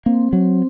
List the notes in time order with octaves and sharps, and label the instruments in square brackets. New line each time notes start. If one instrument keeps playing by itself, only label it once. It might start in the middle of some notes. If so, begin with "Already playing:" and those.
[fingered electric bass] A#3 [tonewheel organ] C4
[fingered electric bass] F#3